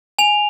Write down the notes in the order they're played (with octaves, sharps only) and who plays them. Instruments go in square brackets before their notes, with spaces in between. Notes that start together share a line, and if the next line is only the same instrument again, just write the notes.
[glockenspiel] G#5 F7